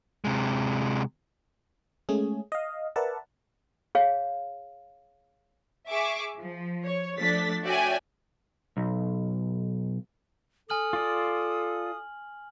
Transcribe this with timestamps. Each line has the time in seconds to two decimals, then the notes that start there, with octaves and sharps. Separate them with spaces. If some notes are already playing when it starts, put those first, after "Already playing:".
0.25 C3 G#3
2.09 G#3 A3 C#4 G#4
2.52 D#5 F5
2.96 A#4 B4 D5 E5 F#5 A5
3.95 G#4 C#5 F5
5.90 G#4 E5 C#6 D6
6.38 F3
6.83 C#5
7.17 F3 A3 D4 A6 B6
7.63 F#4 C#5 D5 E5 G5 G#5
8.77 B1
10.70 A4 G#5 D#6 F6 F#7
10.93 F4 D5